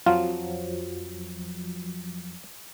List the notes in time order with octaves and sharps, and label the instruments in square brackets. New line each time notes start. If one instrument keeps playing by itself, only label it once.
[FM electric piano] F2 F3 F#3 [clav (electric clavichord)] F4